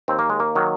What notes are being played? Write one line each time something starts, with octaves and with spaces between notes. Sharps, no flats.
D#2 C4
A#3
G#3
A#3
D#3 F#3